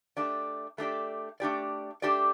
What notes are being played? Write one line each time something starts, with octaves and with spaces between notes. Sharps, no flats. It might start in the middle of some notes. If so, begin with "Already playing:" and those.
A3 D4 G4 D5
A3 D4 G4 D5
A3 D4 G4 D5
A3 D4 G4 D5